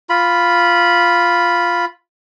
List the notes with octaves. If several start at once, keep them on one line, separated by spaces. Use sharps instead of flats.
F4 B5